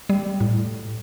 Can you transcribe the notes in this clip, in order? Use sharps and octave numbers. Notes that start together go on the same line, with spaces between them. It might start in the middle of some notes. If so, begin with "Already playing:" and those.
G3
A2